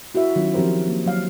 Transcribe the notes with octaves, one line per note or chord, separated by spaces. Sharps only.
E4 F#4 A#4 E5
D#3 F#3 C#4 F4
F3 C4 G4 A#4 C5
A#3
F#3 F5